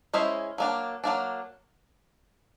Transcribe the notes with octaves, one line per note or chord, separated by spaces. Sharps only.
G#3 C#4 E4 G#4 C5
F#3 A#3 D4
F#3 A#3 D4